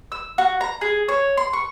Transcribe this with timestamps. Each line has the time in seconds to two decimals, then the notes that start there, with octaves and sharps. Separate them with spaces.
0.12 E6
0.38 F#4
0.61 A#5
0.81 G#4
1.08 C#5
1.37 C6
1.53 C#6